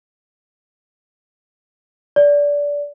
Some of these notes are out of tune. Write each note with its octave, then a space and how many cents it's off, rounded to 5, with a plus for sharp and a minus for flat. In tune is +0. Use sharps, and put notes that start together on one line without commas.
D5 -20